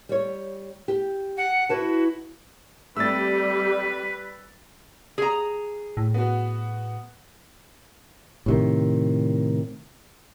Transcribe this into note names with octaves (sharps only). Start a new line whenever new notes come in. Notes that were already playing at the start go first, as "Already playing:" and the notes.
G3 C#5
G4
F#5
E4 F#4 B4 A5
G3 A3 C4 G4 B4 E6 A6
G#4 A#5
A2
B3 F#4
A2 C3 D#3